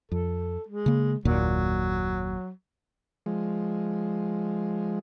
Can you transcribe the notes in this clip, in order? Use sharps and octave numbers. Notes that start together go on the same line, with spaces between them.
F2 A4
G#3
C#3 A#3
F#1 D#2 A#2 F#3
F3 G#3